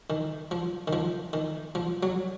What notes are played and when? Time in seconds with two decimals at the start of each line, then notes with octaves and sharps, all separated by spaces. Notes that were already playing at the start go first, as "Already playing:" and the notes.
0.10 D#3
0.51 F3
0.88 D#3
0.93 F3
1.33 D#3
1.75 F3
2.03 F#3